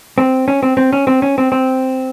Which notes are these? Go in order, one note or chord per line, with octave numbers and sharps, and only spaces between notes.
C4
C#4
C4
C4
C#4
C4
C#4
C4
C4